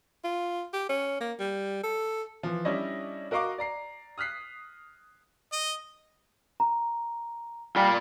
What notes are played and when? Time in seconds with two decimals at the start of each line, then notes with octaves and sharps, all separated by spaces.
0.24 F4
0.74 G4
0.89 C#4
1.21 A#3
1.39 G3
1.84 A4
2.43 E3 F3
2.65 G3 C#4 D4 E4 C#5 D#5
3.31 F#4 A#4 D#5 F5 C#6 D6
3.58 D5 A#5 C7
4.18 D#6 F6 F#6 B6 C7
5.52 D#5
6.60 A#5
7.76 G3 F4 D5 F5